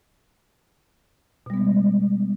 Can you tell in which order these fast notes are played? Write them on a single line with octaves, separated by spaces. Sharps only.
B2 G3 B3 G#3